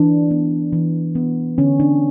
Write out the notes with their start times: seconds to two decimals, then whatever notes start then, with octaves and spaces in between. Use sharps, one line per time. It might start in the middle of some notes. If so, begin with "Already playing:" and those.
Already playing: E3 D4
0.31 B3
0.73 E3
1.15 B3
1.58 D3 C#4
1.80 D4